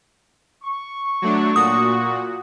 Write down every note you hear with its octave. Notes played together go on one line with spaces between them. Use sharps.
C#6
F#3 A3 D4
A#2 F#4 D#6